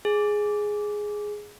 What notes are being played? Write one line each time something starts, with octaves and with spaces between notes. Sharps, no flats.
G#4